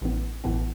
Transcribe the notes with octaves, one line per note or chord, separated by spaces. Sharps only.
A1 A2 E3 B3
A1 A2 E3 B3